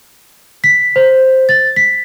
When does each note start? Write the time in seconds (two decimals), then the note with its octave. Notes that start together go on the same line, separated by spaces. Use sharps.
0.64 B6
0.96 C5
1.49 A6
1.76 B6